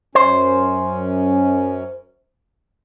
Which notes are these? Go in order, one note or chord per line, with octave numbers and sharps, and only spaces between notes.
F#2 C#4 C5